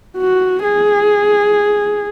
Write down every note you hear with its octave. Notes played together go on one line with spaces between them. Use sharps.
F#4
G#4